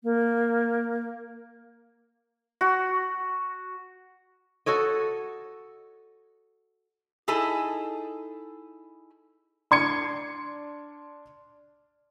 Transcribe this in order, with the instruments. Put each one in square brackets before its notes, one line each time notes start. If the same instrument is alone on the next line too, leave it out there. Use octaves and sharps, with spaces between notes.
[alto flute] A#3
[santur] F#4
[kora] F#4 A4 C#5 D#5
[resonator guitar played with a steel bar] D#4 E4 G#4 A4
[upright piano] D4 C6 G#6 C#7